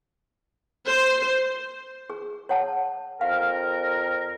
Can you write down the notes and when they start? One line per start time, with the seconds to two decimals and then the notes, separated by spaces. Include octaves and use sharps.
0.86 C5
2.10 G#4
2.49 C#5 F#5 A5
3.21 F2 A#4 F5